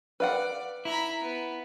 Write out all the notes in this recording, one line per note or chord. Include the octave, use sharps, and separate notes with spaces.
B4 D5 F5 F#5
E4 A#5 B5
B3